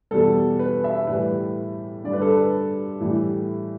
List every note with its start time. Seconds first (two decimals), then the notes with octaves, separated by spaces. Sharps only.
0.11 E2 B2 G3 A4
0.59 B4
0.84 E5
1.07 A2 E3 G3 B4
2.04 G2 D3 G3 D5
2.13 B4
2.21 A4
2.30 B4
3.00 A2 E3 G3